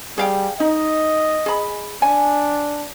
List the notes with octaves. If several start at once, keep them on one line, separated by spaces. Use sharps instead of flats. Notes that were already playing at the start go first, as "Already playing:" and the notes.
G3 G#4 F5 G5
D#4 D#5
G#4 B5
D4 G#5